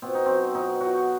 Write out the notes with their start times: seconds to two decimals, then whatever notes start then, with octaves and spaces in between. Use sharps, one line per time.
0.02 B2 C4
0.15 D#4
0.26 F#3 C4
0.54 B2 D#4
0.80 F#3 F#4